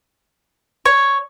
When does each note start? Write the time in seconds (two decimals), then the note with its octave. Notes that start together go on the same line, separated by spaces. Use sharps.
0.85 C#5